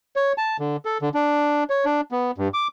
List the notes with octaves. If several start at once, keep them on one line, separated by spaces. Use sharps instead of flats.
C#5
A5
D3
A4
D3
D4
C#5
D4
B3
G2
D6